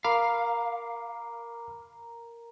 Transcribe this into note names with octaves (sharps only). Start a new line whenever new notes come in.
A#4 F5 B5 D6 C7